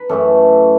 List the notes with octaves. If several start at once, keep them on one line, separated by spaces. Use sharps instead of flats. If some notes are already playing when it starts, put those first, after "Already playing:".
Already playing: B4
F#2 E3 A3 A4